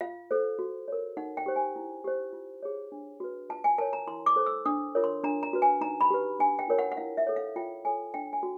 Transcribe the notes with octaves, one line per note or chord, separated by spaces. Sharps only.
F4 F5
A4 C5
F#4
A#4 C#5
D#4 F#5
G5
G4 C5
G#5
E4
G4 C5
F4
G#4 C#5
D4
F#4 B4
F4 A5
G#5
A#4 C#5 A5
A#5
E4 C6
D6
A4 C5
E6
D4 D#6
F4 A#4 C#5
C6
D4 A#5
A#5
F#4 B4
G#5
D#4 A#5
B5
G4 B4
D4 G#5
G5
F4 A#4 C#5
F#5
F#5
E4 F5
E5
A4 C#5
F5
F4 G5
A4 C#5 G#5
D4 G5
G#5
F#4